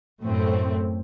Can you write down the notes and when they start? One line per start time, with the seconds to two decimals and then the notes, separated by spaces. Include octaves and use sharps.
0.23 F#2 A2 A3 C4